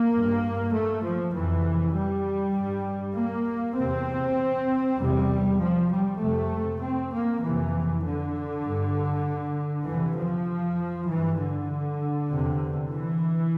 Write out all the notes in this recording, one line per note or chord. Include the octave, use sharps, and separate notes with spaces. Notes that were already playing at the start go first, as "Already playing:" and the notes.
Already playing: A#3
G2
A3
F3
F2 C3 E3
G3
G2
A#3
E2 C3 C4
E2 C3 G3
F3
G3
F2 C3 A3
C4
A#3
F2 C3 E3
D3
G2
F2 C3 E3
F3
G2 E3
D3
E2 C3
E3